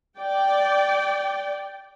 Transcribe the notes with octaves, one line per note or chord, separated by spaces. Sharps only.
D5 G5